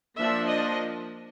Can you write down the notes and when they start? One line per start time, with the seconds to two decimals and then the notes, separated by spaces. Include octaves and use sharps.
0.16 F3 A#3 D4 E5
0.45 D#5